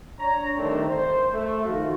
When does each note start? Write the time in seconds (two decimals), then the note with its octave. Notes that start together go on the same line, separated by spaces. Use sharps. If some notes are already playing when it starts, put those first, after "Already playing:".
0.18 D4 C#5 A#5
0.55 D3 D#3 G3 A3 C4 D4
0.88 C5
1.32 A3
1.65 D#3 F3 F4 F#4